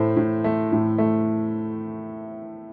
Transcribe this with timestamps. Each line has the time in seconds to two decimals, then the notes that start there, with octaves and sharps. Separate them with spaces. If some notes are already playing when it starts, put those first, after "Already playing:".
Already playing: A2 A3 C5
0.17 A2
0.44 A3
0.72 A2
0.98 A3